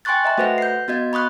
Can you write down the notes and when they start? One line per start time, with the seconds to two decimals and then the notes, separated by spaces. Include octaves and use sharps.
0.05 G5 G#5 C6 C#6 F#6 A6
0.25 D#5 E5 A#5
0.38 A3 F#4 B4 C5 F#5 A#6
0.58 G6 C7
0.88 B3 F#4 D#5 G#6
1.13 B5 C#6 D#6 F#6